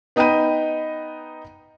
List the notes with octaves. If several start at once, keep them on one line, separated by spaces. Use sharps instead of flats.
B3 D#4 D#5 G5 B5 D#7